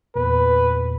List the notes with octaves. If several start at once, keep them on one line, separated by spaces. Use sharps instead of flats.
E2 A#2 B4